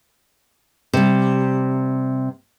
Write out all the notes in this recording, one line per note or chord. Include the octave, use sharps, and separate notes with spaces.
C3 G3